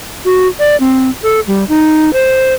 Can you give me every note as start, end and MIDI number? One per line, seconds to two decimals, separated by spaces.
0.25 0.48 66
0.59 0.76 74
0.80 1.10 60
1.23 1.40 69
1.47 1.64 55
1.69 2.13 63
2.13 2.54 72